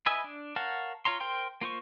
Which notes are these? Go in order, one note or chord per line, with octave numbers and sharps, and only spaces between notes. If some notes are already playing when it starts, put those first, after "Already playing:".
E4 B4 D#5 E5 G#5
D4
A#4 C#5 F5 F#5 A5
F4 C#5 A#5 C6
A#4 C5 G5 C6
A#3 F4 C5 C#6